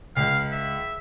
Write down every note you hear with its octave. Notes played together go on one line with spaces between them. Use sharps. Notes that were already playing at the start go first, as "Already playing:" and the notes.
C#2 F5
E5